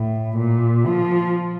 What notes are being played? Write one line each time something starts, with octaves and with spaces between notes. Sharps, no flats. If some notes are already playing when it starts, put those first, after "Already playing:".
Already playing: A2
A#2
F3